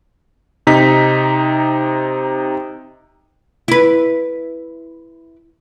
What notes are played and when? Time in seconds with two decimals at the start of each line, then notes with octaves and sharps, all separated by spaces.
0.67 C3 D#4 B6
3.68 E4 B4